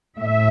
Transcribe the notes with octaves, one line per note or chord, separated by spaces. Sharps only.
A2 E5